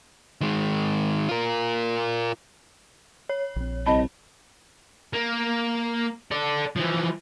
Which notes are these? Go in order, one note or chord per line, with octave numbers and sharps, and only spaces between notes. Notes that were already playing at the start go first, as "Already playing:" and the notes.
D#3 G#3
F4 A#4
C#5
A#1 C4
C2 D#5 A5 B5
A#3
A4 D5
E3 F3